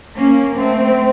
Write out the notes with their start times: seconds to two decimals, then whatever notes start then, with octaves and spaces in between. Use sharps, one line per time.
0.16 A#3 C#4
0.56 A3 C4